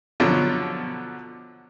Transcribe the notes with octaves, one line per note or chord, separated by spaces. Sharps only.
B2 D3 F3 F#3